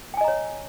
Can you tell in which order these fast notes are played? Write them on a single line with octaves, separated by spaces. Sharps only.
G5 G#5 D#5 A#5 C#5